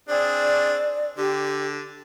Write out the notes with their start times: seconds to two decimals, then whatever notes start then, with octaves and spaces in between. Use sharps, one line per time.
0.09 C4 D4 G#4 D5
1.18 D3 G4